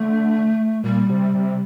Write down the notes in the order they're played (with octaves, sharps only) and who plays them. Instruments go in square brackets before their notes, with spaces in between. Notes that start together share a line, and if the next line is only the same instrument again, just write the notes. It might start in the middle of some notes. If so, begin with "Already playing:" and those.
Already playing: [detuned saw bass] D3 [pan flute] A3
[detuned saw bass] A#2 [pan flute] G3
[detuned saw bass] C3
C3